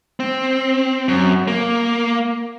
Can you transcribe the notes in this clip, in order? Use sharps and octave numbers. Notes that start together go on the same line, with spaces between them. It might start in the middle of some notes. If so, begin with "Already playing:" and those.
C4
F#2
A#3